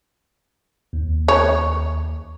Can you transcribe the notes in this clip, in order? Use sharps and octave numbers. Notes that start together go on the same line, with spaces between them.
D#2
C#5